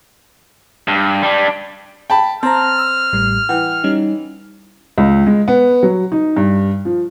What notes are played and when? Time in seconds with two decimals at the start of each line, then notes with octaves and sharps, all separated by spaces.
0.88 G2
1.23 G3 D4
2.10 G5 A5 B5
2.43 C4 A5 A#5 F6
2.79 E6
3.13 A1 A2 G3
3.49 E3 F#5 G5
3.84 G3 C#4 D#4
4.98 C#2
5.27 G#3
5.48 B3
5.83 F#3
6.12 D#4
6.37 G2
6.85 F3